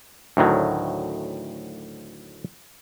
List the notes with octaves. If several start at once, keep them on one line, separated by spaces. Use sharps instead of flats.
D2 A2 D#3 F#3